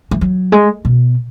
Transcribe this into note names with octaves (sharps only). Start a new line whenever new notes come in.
E3
F#3
G#3
B2